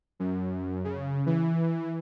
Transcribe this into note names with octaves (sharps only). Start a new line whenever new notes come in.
F#2
C#3
E3